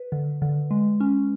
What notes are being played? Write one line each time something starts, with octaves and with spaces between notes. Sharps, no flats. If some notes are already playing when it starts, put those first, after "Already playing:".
Already playing: B4
D3
D3
G#3
C#4